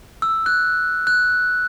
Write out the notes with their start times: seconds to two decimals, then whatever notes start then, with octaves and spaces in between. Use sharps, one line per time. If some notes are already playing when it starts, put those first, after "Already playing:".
0.22 E6
0.46 F#6
1.07 F#6